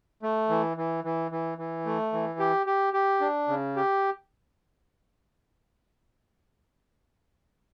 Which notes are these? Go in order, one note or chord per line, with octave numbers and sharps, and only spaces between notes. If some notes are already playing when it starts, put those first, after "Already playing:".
A3
E3
E3
E3
E3
E3
A3
E3
G4
G4
G4
D4
C#3
G4